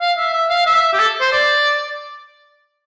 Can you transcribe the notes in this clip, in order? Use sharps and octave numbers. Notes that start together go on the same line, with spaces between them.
F5
E5
E5
F5
E5
G4
A4
C5
D5